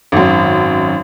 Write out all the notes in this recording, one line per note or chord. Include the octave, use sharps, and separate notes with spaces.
G#1 F#2